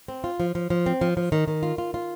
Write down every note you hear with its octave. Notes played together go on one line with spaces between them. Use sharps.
C4
F4
F3
F3
F3
C4
F3
F3
D#3
D#3
F4
F4
F4